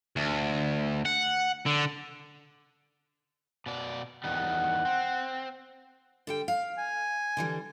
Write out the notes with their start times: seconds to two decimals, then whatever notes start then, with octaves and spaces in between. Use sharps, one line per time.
0.16 D2
1.06 F#5
1.66 D3
3.66 B2 D5
4.24 E2 D#3 G3 F#5
4.85 C4
6.27 D3 G3 G5
6.48 F5
6.78 G#5
7.37 D3 E3 G3